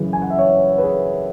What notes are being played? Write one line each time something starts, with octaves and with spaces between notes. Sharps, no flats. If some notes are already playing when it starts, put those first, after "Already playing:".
Already playing: F#2 C#3 E3 B4
G#5
F#5
E5
C#5
B4
G#4